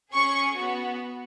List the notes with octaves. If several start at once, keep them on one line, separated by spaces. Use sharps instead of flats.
C#4 G#4 C#6
B3 F#4